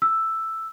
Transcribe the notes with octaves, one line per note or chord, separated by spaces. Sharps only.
E6